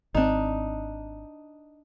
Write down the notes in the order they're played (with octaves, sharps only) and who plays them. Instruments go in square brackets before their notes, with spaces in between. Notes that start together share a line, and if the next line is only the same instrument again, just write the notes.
[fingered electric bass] G#1 C4 [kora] D4 D#4